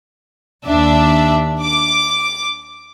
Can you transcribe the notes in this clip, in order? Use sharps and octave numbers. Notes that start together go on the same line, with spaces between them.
D#2 D4 E5
D6